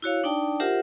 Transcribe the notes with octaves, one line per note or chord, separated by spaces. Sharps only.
E4 F#4 C#5 F5
D4 D#4 D5 G5 A5
F4 G4 A#4 C5 E5 F#5